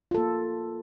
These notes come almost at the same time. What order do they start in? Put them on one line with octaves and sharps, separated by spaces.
F4 A4 A#3